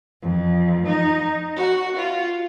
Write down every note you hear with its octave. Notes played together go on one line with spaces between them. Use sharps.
F2
D#4
F#4
F4